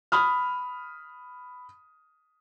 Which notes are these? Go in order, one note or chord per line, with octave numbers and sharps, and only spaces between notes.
B5 D#6 F6